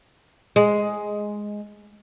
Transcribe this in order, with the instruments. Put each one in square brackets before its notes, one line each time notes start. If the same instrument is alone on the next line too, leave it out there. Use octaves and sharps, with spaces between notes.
[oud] G#3